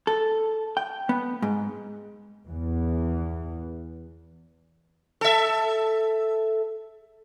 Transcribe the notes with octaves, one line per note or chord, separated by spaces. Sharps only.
A4
G5
B3
G#2
E2 E3
A4 E5